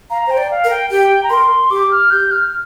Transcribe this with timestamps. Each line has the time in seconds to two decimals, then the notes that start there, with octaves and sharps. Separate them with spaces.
0.10 F5 A#5
0.27 C5 G5
0.37 D5
0.51 F5
0.64 A#4
0.70 G5
0.90 G4 G5
1.23 A#5
1.30 A#4 C6
1.71 G4 D6
1.91 F6
2.11 G4 G6
2.31 F6